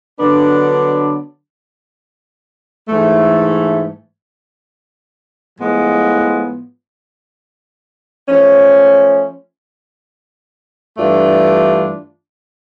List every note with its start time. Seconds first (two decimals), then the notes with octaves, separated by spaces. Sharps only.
0.19 D3 F#3 B3 D4
2.89 G#2 E3 A3
5.59 A2 F3 G#3 B3
8.28 F3 A3 C#4
10.97 G2 E3 A3 D4 F4